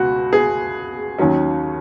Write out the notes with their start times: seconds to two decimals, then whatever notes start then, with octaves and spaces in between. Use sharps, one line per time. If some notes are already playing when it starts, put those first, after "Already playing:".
Already playing: C#2 B2 F#4
0.33 G#4
1.19 D#2 D#3 F#3 C#4